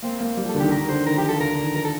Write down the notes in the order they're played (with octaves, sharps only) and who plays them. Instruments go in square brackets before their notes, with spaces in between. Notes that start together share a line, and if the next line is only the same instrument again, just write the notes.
[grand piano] A#3 [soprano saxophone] C4
[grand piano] A#3
G3
[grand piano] F3 [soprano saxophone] A4
[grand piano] D3
[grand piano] D#3 [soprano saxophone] G4
[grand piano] D#3 [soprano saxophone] A#4
[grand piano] D3 [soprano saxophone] C5
[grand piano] D#3 [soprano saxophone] A#4
[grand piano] F3 [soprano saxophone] G4
[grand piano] F3 [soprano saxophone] A4
[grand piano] D3 [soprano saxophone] A#4
[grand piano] D3
D#3
[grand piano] F3 [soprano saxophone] A#4
[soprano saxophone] A4